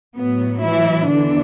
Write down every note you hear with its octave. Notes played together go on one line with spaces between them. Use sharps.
A2 F#3 B3
E3 E4
E2 D3 E3 D4